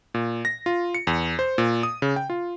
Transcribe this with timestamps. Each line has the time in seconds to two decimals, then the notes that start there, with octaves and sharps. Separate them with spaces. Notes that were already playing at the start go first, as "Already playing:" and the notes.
0.14 A#2
0.45 A#6
0.66 F4
0.95 C#7
1.07 E2
1.39 C5
1.58 A#2
1.83 D#6
2.02 C#3
2.16 G5
2.30 F4